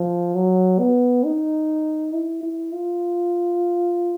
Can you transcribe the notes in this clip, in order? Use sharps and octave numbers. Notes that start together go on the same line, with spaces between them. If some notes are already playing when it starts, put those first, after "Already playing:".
Already playing: F3
F#3
B3
D#4
E4
E4
F4